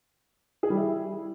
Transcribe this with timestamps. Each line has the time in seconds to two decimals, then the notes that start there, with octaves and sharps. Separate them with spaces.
0.63 G#4
0.70 G3
0.77 E4